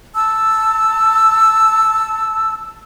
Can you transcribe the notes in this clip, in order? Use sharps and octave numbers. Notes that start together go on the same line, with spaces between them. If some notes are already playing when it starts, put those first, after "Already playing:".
A5 E6